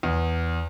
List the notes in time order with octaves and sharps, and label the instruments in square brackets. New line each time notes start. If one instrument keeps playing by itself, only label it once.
[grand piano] E2